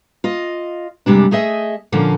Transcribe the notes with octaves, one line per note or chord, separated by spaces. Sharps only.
F4 D#5
F#2 C3 G3 G#3 D4
A3 G#4 D#5 E5
A#2 D3 F3 A#3 C#4 A4